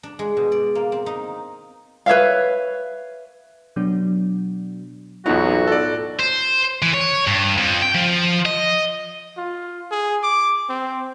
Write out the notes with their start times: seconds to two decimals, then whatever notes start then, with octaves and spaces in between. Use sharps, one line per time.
0.03 D4
0.19 G#3
0.37 B2
0.52 D5
0.75 A#3
0.92 C4
1.06 D#4
2.06 B4 C#5 E5 F5
3.76 B2 F#3 B3 D4 F#4
5.26 B1 E2 A2 B3 D#4 F4 F#4
5.67 A4 D5
6.19 C5
6.82 E3
6.94 C#5
7.27 G2
7.58 F2
7.82 G5
7.95 F3
8.46 D#5
9.38 F4
9.91 G#4
10.23 D6
10.69 C4